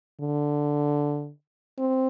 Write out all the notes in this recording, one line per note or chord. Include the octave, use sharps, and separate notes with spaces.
D3
C4